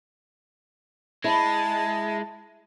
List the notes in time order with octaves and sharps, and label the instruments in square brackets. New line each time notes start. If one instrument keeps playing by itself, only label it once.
[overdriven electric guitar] G#3 [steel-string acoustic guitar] E4 [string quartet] A5